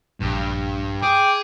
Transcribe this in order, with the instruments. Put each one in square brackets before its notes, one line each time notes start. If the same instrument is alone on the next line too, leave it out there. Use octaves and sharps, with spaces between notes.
[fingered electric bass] A#1 [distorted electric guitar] G2
[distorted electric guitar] G#4 [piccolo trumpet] G5 [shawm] D6